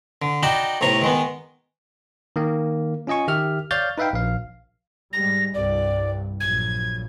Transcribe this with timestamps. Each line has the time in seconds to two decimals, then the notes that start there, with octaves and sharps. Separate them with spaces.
0.22 D3
0.43 D#4 F#4 D5 G5 A5 B5
0.81 B1 A2 C3 A#5 C#6
1.02 D#3 G#3 B3
2.36 D#3 A#3
3.07 C#4 F4 D#5 G#5 C#6
3.27 D#3 G4 E5 F6
3.71 C#5 D5 F5 F6 G6 A6
3.98 D#4 B4 E5 F5 G5
4.13 A#1 F5
5.13 G#2 G3 A#6
5.54 C2 G2 D5
6.40 A#1 F#3 G#6